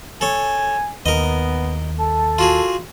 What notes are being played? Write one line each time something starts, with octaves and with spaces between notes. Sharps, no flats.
A4 C#5 G#5
D#2 B3 A#4 D#5
A4 A5
F4 F#4 G#4